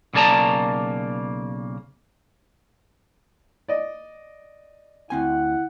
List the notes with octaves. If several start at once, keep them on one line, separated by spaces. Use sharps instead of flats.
B1 C#3 A#3 D5 A5 A#5
D5 D#5
D2 C4 E4 F#5 G#5